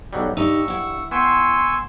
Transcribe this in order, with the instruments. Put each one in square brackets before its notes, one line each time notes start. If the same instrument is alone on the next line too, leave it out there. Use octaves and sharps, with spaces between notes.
[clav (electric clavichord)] B1 F#3 G3
[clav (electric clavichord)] G2 [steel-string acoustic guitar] D#4 G4 [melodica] C#6 E6
[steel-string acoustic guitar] E4 F#5
[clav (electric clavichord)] B3 G5 [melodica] G#5 C#6 E6 [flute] C6